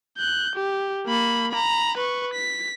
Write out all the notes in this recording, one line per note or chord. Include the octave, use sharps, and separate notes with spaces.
F#6 G6
G4
A#3 B5
A#5 B5
B4 C#6
B6